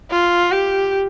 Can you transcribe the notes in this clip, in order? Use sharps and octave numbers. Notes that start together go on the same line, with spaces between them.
F4
G4